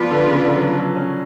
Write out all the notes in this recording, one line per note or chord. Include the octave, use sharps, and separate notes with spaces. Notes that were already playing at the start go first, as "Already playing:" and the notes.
Already playing: F3 B3 F4 B4 D5
D3
C#3
D3
F#3
F3
F#3
C#4